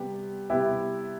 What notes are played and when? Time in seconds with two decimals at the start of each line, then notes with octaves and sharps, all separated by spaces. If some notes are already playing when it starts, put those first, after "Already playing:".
Already playing: C3 G3 B3 G4
0.50 C3 G3 B3 E4 G4